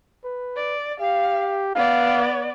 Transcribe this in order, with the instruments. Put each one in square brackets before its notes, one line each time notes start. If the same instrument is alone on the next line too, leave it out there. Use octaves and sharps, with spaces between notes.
[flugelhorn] B4
[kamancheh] D5
[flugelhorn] G4 [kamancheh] F5
[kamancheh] B3 D5 [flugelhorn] F5